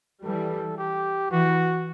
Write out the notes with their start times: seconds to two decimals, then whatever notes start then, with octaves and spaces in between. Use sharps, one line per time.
0.24 E3 G3 A4
0.78 G4
1.31 E3 F#4